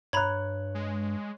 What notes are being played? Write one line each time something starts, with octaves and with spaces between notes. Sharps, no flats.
G2 C#5 A#5 B5 F#6 G#6
G#3